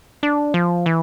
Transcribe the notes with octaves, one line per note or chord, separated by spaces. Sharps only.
D4
F3
E3